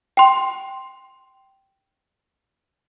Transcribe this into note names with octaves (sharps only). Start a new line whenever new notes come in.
G5 C6